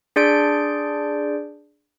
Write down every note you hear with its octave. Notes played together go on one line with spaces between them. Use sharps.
D4 G#4 D5 C6 G6 D7